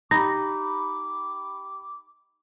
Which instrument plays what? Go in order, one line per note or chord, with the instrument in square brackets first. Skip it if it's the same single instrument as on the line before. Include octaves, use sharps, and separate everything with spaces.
[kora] D#4 [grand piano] G4 B5 [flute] D6 [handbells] A#6